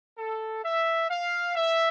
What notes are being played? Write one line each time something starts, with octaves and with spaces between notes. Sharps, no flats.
A4
E5
F5
E5